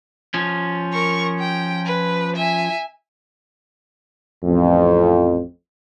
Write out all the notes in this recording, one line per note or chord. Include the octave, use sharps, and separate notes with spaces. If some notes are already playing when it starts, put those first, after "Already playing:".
F3 C#4
A#4 C#6
G5
B4
E5 G#5
A1 F2